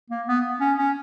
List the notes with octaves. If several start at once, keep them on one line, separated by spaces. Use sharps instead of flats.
A#3
B3
C#4
C#4